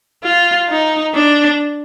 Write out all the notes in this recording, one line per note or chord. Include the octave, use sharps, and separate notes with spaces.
F4
D#4
D4